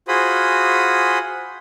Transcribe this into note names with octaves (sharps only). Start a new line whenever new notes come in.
F4 F#4 G#4 C5 B5 D#6